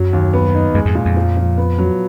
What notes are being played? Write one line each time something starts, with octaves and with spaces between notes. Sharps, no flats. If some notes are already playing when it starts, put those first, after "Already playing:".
Already playing: F#2 F#3
D#2
B3
D#4
F#2 G#3
F2 G#2
A#2
F2
F3
F3
B3
F#3